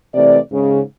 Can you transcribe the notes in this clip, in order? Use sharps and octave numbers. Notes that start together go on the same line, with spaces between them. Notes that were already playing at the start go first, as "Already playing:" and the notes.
C3 E3 A3 D5
G#2 C#3